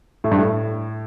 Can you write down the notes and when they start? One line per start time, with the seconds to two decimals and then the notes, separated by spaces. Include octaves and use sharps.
0.24 A2
0.31 G2
0.38 A2